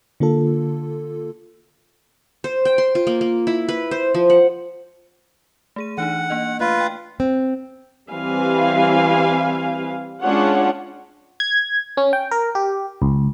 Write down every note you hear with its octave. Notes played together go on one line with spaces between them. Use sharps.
D3 A#3 F4 A4
C5
G5
C6
F4
A#3
A#3
E4
B4
C5
F3
F#5
A3 G#4 D#7
E3 D4 D#4 F#5
A#3 D4 D#5
A3 F4 B4
G5
C4
E3 G3 C4 B4 F5 G#5
G#3 C#4 D4 F4 C#5 F#5
G#6
C#4
G5
A#4
G4
C#2